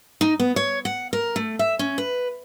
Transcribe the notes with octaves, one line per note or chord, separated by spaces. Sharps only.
D#4
B3
C#5
F#5
A#4
A3
E5
C#4
B4